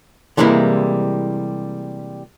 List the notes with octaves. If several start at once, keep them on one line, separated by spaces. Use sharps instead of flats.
C3 E3 G3 G#3 A#3 E4